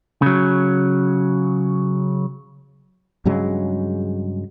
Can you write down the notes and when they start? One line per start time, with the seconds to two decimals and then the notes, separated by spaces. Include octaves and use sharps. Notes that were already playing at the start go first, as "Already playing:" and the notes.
0.22 C#3 F#3
3.25 G2 C#3 F#3 G#3